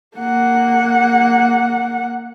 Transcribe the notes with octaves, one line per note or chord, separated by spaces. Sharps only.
A#3 F#5